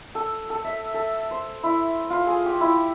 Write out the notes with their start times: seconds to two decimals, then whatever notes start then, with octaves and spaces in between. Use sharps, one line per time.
0.15 A4
0.50 A4
0.64 E5
0.94 A4
1.31 C5
1.63 E4
2.10 F4
2.27 G#4
2.45 G4
2.61 E4